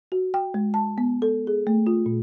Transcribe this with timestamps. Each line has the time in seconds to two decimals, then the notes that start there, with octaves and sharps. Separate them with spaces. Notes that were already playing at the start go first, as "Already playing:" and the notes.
0.12 F#4
0.34 G5
0.54 G#3
0.74 A5
0.98 B3
1.22 A4
1.47 G#4
1.67 A3
1.87 F4
2.06 A#2